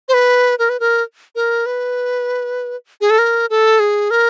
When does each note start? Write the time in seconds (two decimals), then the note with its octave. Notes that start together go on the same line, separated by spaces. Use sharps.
0.09 C5
0.14 B4
0.59 A#4
0.69 B4
0.80 A#4
1.35 A#4
1.66 B4
3.01 G#4
3.10 A4
3.19 A#4
3.50 A4
3.80 G#4
4.11 A#4